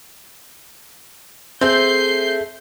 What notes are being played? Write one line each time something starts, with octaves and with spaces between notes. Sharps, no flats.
A3 C4 G#4 G6 C7